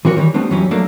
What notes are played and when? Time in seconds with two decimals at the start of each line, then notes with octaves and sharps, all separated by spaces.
0.05 E3 C4 F#4 A#4 C#5
0.17 D#3 E3 G3 C#5
0.34 G3 A3 B3 C4 D4
0.50 F2 E3 F#3 G3 C#4
0.71 F#3 A3 A#3 D4